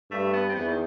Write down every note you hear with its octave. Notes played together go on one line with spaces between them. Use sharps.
G2 A3
B3
C4
E2 B3
D#3